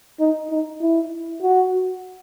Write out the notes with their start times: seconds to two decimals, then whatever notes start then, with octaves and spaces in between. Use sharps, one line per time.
0.20 D#4
0.50 D#4
0.81 E4
1.42 F#4